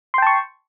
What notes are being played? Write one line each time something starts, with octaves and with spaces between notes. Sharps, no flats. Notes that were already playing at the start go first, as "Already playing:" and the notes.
G5 A5 C6 C#6